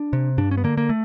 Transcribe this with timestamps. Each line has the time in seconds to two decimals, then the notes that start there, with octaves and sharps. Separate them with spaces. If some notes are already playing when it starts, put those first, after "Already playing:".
Already playing: D4
0.13 C3
0.38 G2 D4
0.51 C#4
0.57 B3
0.64 D3 A#3
0.78 A#3
0.89 A3